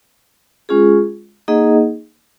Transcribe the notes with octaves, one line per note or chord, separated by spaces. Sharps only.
G#3 C#4 F4 G#4
A#3 D#4 G#4 D#5 F#5